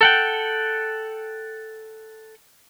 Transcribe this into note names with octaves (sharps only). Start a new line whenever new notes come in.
A4 F#5 G5